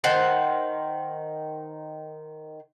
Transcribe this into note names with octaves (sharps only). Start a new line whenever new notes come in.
D#3 C5 F#5 A5